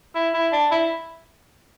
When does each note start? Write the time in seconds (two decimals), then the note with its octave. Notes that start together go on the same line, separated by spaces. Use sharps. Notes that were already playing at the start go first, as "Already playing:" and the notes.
0.15 E4
0.34 E4
0.52 D4
0.71 E4